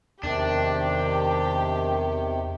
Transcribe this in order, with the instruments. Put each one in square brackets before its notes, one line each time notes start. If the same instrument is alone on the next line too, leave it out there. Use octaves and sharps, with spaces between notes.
[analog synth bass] E2 [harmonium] C3 D#3 [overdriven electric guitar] D4 [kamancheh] G4